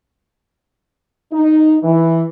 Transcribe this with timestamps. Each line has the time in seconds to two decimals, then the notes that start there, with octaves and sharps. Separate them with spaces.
1.32 D#4
1.83 E3